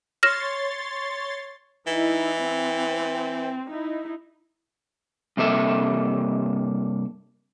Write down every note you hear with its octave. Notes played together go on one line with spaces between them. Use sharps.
C#5 C6 F6 A6 A#6 E7
E3 D#4 E4
C4
D#4 E4
G2 C3 A#3 A4 E5